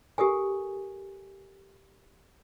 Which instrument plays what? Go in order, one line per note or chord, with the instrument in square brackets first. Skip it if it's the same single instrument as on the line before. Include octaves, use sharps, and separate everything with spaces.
[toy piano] G4 A4 A#4 G#5